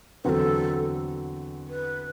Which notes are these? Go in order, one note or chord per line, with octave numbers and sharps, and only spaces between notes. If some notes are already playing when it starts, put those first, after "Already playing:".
E2 D3 F#3 C4 F#4 A4 B4
B4